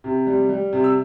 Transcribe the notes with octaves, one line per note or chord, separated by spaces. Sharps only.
C3
G3
G3
C3
E6